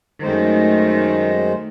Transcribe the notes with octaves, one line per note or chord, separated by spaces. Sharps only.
F#2 D#3 G#3 A3 C5